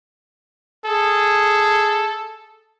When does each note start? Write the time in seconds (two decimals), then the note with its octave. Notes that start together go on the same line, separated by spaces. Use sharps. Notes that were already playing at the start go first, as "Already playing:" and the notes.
0.86 G#4 A4